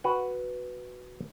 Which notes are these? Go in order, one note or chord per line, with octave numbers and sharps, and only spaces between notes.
F#4 B4 F#5